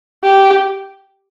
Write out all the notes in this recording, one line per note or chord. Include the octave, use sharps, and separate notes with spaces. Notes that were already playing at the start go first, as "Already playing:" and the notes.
G4